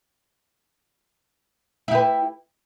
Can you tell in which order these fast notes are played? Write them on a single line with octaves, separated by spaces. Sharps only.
E4 G4 B4